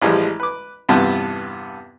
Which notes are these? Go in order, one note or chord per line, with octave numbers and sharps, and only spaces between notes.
A1 E3 F3 G3 G#3
B4 D6
E2 G2 C3 B3 F4 A5